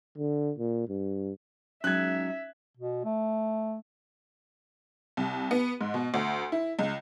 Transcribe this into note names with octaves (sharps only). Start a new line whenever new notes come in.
D3
A#2
G2
F#3 G#3 C#4 D#4 G#4 E5 F#6 G#6
B2
A3
C2
B3
G#2
B2
D2
E4
C#2